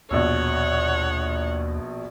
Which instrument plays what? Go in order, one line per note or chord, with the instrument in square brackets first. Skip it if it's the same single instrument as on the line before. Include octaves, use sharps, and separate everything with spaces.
[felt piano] A#1 B2 E6 [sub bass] D#2 [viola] C#5 F#5